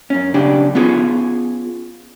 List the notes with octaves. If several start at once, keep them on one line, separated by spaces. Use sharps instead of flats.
F#2 C#4
B1 C#3 D4 G4
B3 C#4 F4 G#4